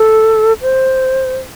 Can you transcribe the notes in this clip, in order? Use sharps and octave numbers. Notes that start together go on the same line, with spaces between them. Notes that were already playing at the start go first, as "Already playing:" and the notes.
Already playing: A4
C5